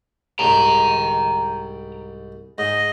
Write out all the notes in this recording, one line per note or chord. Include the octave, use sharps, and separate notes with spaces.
C2 G#2 G5 A#5
G#2 D#5